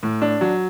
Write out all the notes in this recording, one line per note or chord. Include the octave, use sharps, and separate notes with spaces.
A2
D4
F#3